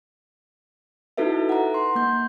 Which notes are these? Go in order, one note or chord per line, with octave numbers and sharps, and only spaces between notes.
D#4 E4 F#4 A4 B4 E5
F#5 A#5
C6
A#3 G6